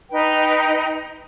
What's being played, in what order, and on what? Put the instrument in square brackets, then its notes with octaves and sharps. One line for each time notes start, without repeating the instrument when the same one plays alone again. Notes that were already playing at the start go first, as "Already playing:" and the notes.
[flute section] D#4 B4 G5